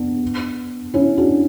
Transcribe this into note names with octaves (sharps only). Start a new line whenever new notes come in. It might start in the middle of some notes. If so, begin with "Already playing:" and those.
Already playing: B3 D4
C#4 E4
D4 F#4